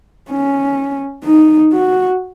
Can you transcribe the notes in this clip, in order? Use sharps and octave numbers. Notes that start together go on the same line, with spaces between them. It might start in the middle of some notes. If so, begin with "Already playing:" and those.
C#4
D#4
F#4